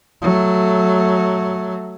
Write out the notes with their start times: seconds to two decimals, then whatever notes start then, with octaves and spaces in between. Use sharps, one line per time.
0.22 F#3 A3